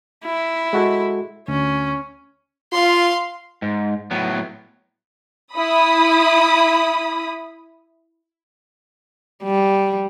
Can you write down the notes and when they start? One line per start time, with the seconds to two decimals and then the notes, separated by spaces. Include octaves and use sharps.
0.25 E4
0.73 G#3 F#4 A4
1.48 D2 C#4
2.72 F4 F5 C6
3.62 G#2
4.11 A2 F#3 B3
5.56 E4 B5 D#6
9.44 G3